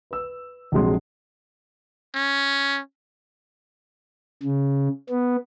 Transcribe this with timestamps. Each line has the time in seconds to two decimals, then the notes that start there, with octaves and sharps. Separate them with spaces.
0.11 B4 E6
0.72 A#1 C3 F#3 G#3 C6
2.16 C#4
4.43 C#3
5.10 B3